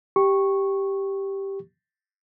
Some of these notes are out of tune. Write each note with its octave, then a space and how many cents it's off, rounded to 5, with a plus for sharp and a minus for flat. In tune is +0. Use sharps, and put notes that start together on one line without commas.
G4 +0 C#6 -10